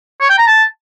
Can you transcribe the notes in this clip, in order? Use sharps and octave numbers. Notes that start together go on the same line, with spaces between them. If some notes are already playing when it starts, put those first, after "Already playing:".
C#5
G5
A#5
A5